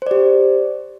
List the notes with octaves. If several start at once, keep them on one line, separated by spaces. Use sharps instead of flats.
G4 C5 D5